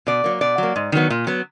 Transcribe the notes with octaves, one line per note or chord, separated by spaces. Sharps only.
B2 D5
F#3 A#3
B2 D5
F#3 A#3
G#2
D#3 F#3 B3
A#2
F#3 B3